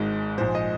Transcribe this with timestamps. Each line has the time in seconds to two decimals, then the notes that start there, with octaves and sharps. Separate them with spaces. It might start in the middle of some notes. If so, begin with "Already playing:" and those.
Already playing: G#1 G#2 G#3
0.38 A#1 G#2 F3 G#3 C5
0.55 D#5